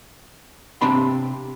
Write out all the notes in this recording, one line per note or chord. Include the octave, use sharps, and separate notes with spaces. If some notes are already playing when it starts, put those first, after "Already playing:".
C3 C4 D4 B5 C6